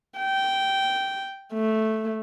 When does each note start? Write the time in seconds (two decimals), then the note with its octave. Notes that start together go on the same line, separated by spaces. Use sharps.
0.19 G5
1.53 A3